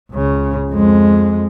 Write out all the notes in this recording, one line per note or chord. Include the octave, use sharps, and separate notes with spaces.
C#2 C#3
F2 G#3